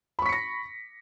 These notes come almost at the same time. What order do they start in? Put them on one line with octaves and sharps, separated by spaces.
B5 C#6 B6 C#7 A#6